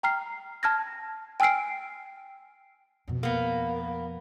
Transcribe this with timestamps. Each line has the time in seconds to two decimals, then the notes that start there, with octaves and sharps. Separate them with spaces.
0.03 G5 A#5 F6 C7
0.63 A5 F6 G#6 A#6
1.40 G5 G#5 E6 F6 C7 D7
3.08 F2 B2
3.23 A#3 B3